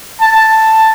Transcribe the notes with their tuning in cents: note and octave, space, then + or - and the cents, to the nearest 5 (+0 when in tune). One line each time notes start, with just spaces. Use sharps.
A5 +5